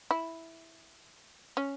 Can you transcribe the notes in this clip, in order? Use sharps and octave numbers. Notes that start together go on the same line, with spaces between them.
E4
C#4